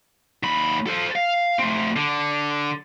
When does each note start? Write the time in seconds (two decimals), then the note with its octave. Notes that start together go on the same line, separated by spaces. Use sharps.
0.43 D#2 B5
0.87 A4 C5
1.15 F5
1.59 A3 C4
1.96 D3